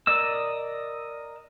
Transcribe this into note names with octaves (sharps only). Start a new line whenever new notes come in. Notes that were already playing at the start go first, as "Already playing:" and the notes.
A#4 D5 D#5 E6